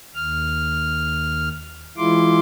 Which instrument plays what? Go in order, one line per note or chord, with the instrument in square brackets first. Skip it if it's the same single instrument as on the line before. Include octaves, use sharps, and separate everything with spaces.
[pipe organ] D#2 F6
E3 G#3 E4 F4 C6 D6